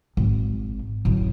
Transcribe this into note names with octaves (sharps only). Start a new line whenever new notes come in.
G#1
A1 F#2